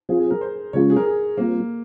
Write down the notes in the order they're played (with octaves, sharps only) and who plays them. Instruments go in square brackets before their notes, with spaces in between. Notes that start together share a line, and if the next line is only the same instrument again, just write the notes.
[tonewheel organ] F3 C4 F4 [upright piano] G#4
[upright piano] G#4
A#4
C5
[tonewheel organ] C#3 F3 G#3 C#4 F4 [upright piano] C#5
[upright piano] G#4
A#4
G#4
[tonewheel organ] G3 C4 F4 [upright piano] A#3